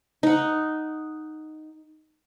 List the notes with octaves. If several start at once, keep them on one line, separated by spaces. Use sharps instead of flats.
D#4 F#5